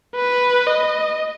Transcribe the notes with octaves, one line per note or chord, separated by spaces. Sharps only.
B4
D#5